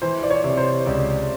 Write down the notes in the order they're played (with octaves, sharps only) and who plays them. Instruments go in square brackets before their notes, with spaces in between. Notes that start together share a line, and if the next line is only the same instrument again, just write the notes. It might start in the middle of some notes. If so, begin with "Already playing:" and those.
[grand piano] E3 [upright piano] C5
[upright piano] D5
C#5
[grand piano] C3
[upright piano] C5
[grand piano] C#2 [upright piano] D5